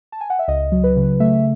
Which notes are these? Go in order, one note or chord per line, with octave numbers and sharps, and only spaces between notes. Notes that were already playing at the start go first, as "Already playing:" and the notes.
A5
G#5
F#5
E5
C#2 D#5
F#3
B4
C#3
A3 E5